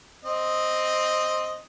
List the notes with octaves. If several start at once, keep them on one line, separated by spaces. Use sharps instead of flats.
C4 D#5